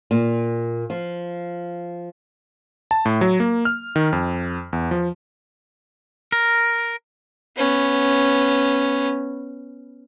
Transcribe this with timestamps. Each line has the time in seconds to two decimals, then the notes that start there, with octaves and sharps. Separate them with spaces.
0.11 A#2
0.90 F3
2.91 A5
3.05 A2
3.21 F#3
3.40 A#3
3.65 F6
3.96 D#3
4.13 F2
4.73 E2
4.91 F3
6.32 A#4
7.57 B3 C#4